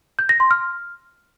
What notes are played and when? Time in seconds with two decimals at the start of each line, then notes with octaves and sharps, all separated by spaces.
0.19 G6
0.29 A#6
0.40 C6
0.51 F6